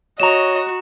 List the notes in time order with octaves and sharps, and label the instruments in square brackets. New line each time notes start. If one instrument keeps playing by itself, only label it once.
[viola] F#4 [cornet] C#5 [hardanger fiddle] D#5 [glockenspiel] A#5 E7